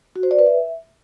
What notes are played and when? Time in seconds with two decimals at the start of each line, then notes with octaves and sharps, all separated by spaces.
0.16 F#4
0.23 C5
0.31 D5
0.39 B4
0.46 E5